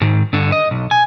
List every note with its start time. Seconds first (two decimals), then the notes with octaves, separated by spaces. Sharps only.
0.01 G#2 D#3
0.33 G2 D3
0.52 D#5
0.71 B1
0.91 G#5